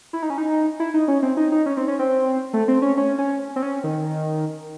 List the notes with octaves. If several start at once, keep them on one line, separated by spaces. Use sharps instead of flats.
E4
D#4
C#4
D#4
E4
D#4
C#4
C4
D#4
D#4
C#4
C4
C#4
C4
A3
C4
C#4
C#4
C#4
C4
C#4
D#3